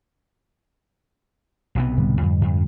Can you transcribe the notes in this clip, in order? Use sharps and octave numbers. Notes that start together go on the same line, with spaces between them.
B1 C3 B3
G#2 D3 G3
F2
F2